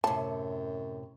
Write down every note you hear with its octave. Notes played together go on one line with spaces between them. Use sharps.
F#2 A2 C3 A5